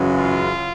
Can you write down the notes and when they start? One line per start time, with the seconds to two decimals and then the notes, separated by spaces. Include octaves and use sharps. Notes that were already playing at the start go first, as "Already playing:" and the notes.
Already playing: F#2 C#3 E3 G#3
0.16 F4